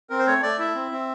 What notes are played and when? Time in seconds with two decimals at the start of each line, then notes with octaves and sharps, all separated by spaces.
0.10 C4 A#4
0.19 C5
0.27 A3 C#5
0.43 A3 D5
0.59 E4 E5
0.75 C4
0.91 C4